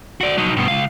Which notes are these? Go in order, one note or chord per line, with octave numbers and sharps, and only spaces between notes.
F#4 D5
F#3 D#4
G2 B2
C#2 F5